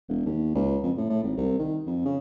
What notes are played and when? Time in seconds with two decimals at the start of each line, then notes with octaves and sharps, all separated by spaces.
0.09 E1
0.26 D#2
0.55 C#2
0.83 F2
0.97 A2
1.10 A2
1.23 G#1
1.37 C2
1.59 D#3
1.86 F2
2.05 C#3